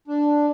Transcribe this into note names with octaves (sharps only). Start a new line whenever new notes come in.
D4